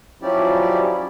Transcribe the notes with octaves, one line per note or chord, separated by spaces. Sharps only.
F3 F#3 C#4 E4 G4 D5